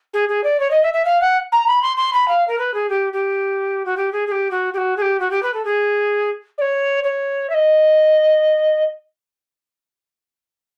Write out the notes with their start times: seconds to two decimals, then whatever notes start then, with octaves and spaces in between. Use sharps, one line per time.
0.13 G#4
0.28 G#4
0.43 D5
0.60 C#5
0.70 D#5
0.83 E5
0.93 E5
1.05 F5
1.21 F#5
1.52 A#5
1.67 B5
1.82 C6
1.97 C6
2.13 B5
2.28 F5
2.48 A#4
2.58 B4
2.74 G#4
2.89 G4
3.13 G4
3.85 F#4
3.97 G4
4.12 G#4
4.27 G#4
4.31 G4
4.51 F#4
4.73 G4
4.77 F#4
4.97 G#4
5.02 G4
5.20 F#4
5.30 G4
5.42 B4
5.53 A4
5.65 G#4
6.58 D5
6.61 C#5
7.03 C#5
7.49 E5
7.54 D#5